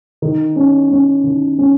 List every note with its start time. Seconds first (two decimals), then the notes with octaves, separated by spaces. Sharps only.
0.22 D#3
0.56 C#4
0.91 C#4
1.24 D#3
1.59 C#4